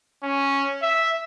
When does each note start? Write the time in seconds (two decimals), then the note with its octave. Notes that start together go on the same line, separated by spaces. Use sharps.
0.23 C#4
0.82 E5